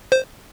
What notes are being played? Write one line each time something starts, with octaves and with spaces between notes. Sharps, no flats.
C5